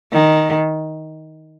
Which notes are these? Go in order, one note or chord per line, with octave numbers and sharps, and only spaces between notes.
D#3